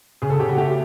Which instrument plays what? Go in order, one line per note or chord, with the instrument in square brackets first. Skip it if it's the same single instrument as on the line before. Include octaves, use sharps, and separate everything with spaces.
[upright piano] C#3 G#4
A4
C#3 G4
F#4
A3 G4